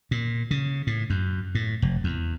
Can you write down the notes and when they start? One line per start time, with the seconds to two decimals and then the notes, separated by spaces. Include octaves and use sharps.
0.11 A#2
0.51 C#3
0.87 A2
1.10 F#2
1.55 A2
1.82 F1
2.04 E2